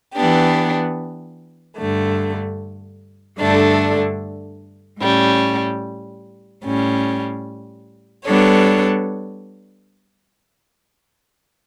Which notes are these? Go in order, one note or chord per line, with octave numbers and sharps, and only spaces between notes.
E3 B3 D4 G4
G2 D3 A3
G2 D3 A3 D4
A2 G3 C#4
A2 G3 C#4
G3 B3 D4 A4 C#5